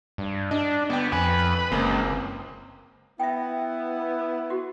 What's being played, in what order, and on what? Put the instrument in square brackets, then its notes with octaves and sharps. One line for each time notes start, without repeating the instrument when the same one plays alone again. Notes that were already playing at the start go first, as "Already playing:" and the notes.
[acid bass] G2
[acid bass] D4 [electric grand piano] D#5
[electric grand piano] G1 G5 [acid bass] B3
[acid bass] F2 [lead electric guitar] B4 [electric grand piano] G#5
[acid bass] F#1 [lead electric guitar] C#2 [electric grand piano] A#3 C4
[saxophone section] B3 E4 [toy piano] E5 G5
[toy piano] F#4 G4